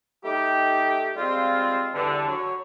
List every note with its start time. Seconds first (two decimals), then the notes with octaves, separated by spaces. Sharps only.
0.25 A3 D#4 G4
1.16 G3 G#3 C4 F4
1.95 E2 G2 D3
2.28 F#3 C#5